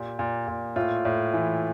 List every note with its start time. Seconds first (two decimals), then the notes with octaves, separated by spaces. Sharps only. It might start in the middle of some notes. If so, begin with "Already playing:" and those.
Already playing: A#2 G4
0.19 A#2
0.48 A#2
0.76 A2 F4
1.05 A2
1.34 E3